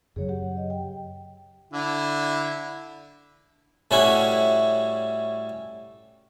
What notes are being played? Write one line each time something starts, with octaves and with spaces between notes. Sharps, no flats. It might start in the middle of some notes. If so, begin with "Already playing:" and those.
F#2 C#3 F#3 G#4 C#5
G4 F#5
D#5
G5
D3 E4
A2 G3 C#4 E4 F#4